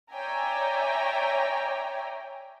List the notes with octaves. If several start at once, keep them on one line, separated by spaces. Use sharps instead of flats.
C#5 D5 E5 G5 G#5 A#5